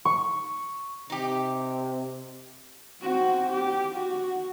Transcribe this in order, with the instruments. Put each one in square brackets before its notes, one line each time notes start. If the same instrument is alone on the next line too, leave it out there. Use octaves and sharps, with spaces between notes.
[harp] C#6
[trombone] C3 [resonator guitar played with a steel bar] D#4 G4
[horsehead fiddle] C4 F#4
G4
F#4